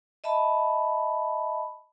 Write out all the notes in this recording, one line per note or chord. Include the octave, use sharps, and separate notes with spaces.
D#5 E5 A5 B5